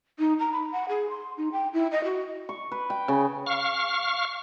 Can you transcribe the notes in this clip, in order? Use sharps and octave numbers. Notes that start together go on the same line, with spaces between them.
D#4
A#5
B5
F#5
G#4
C6
D#4
G5
E4
D#5
F#4
C#6
B4
G5
C#3
F5 C#6 F6